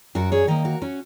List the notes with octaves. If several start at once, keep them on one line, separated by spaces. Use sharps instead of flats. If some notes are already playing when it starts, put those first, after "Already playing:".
F#2 F#4 A#4
G#4 C#5
D#3 A#3 A#4 D#5
F#4 A#4
C#4 F#4